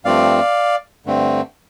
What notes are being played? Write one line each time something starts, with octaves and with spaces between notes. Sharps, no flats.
G2 F3 A3 C4 D5 F5
G2 D3 A3 C4